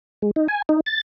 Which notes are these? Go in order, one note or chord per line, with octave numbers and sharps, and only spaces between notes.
G#3
D#4
G#5
D#4
A6